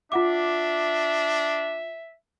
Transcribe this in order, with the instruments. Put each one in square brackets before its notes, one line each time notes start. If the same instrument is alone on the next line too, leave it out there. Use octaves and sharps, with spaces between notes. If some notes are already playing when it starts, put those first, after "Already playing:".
[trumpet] D4 [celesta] F4 F#5 D6 [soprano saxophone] E5